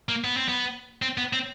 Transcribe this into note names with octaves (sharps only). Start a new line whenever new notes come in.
A#3
B3
C4
B3
C4
B3
C4